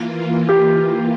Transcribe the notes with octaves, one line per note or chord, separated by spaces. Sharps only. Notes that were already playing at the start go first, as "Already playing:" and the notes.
Already playing: E3 A#3 F4
G4